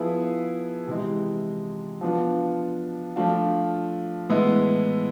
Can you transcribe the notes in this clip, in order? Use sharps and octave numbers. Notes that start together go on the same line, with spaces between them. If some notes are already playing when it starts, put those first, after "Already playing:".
Already playing: F3 B3 E4 G#4 B4
C3 E3 G#3
F3 B3 D4 F4
F3 A3 D4 F4
A2 E3 G#3 B3 E4